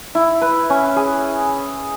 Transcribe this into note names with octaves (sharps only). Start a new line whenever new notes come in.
E4
B4
C#4
G#4